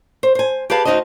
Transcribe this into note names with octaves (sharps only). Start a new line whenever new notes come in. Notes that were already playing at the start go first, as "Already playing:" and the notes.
C5
C5 G#5
G4 G#4 B4 F5 A5
D2 A#2 D#4 F#4 C5 D#5